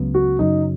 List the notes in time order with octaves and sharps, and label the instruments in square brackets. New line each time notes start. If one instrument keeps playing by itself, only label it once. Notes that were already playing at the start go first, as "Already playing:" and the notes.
Already playing: [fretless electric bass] C#2 C#3 F#3 B3
[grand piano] F#4
[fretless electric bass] F#2 C#3 F#3 [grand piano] D#4